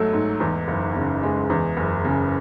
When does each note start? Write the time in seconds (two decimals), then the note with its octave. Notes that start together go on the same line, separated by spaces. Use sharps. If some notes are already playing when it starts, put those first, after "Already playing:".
Already playing: G#2 F#3 A3
0.13 G#2
0.40 E2
0.68 F#1
0.96 C#3
1.23 G#3
1.50 E2
1.77 F#1
2.04 C#3